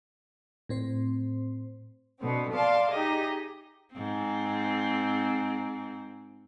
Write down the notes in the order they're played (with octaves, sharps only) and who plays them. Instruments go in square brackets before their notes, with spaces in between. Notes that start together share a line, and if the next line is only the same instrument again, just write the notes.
[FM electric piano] A2 C4 C5
[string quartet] B2 D3 B3 C4
D5 F5 A5 C6
D#4 G4 G#4 D#5
[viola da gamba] G#2 C4